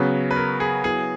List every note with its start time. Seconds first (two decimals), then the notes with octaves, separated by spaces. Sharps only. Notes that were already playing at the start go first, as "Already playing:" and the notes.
Already playing: C#3 F#3 B3 B4
0.31 B4
0.36 A#4
0.60 G#4
0.84 F#3 B3 E4 G#4